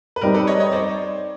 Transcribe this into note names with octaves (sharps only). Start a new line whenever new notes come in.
B4
G3 C4 D#4 G4 A#4
A4 B4
C#5 D#5
C#5 D#5
C5 D5